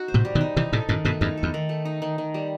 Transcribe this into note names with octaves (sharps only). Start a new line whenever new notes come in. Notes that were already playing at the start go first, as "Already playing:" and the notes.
Already playing: D#4 F#4
C5
A2 C3
G3
B2 D#3
D#4
C3 E3 D#4
A2 C3 A4
F#2 A2 D#3
G2 B2 A3
E2 G2 D#4
A4
E2
D#3
A3
D#4
D#3
D#3
G3